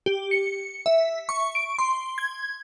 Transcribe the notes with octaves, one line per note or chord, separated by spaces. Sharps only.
G4
C#7
E5
C#6
D7
C6
G#6